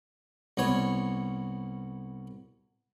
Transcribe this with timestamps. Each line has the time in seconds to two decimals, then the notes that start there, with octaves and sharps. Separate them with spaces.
0.57 C2 B3 C#5 C#6